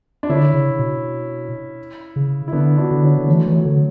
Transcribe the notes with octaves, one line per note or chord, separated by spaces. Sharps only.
D4
D3 C#4 E4
C#3
B2
C#3
E4
D3 B3 D4
D4 F#4
D3
C#4 E4
D3
E3 F#3 A3
E3
F#3
D3